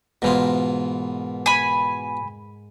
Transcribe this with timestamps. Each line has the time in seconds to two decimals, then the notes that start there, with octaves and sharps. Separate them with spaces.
0.22 G#2 B2 E3 F4 A#4
1.46 G#5 B5